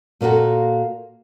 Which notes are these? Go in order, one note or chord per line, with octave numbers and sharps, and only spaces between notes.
A#2 A#3 F4 F#4 A4